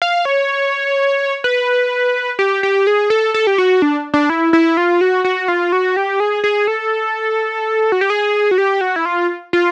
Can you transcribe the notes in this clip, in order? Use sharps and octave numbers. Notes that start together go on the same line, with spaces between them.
F5
C#5
B4
G4
G4
G#4
A4
A4
G4
F#4
D4
D4
E4
E4
F4
F#4
F#4
F4
F#4
G4
G#4
G#4
A4
F#4
G4
G#4
F#4
G4
F#4
E4
F4
F4